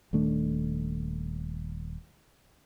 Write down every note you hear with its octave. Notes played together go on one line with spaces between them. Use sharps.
D#1 D#3 A3 D4